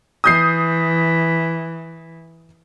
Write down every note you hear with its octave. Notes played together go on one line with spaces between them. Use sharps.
E3 D#6 G6 C7